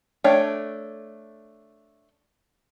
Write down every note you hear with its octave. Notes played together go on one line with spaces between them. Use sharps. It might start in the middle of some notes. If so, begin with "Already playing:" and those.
A3 D4 C#5 G5